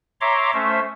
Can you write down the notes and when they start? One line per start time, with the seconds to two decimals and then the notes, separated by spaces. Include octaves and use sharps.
0.21 C#5 E5 A#5 C6 D6
0.54 A3 C#4 C5 E5